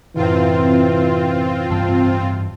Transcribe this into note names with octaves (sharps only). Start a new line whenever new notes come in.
F#2 A2 C3 E3 C4 F4
G2 E3 G5 A5 E6